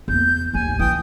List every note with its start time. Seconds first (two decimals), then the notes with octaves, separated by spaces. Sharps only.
0.08 E2 A#3 G6
0.53 A1 D#2 G#5
0.79 E3 G5 D#6 G6